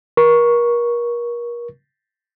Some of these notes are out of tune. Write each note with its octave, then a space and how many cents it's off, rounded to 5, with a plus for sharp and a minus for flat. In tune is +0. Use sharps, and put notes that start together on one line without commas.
A#4 +35 C#6 +0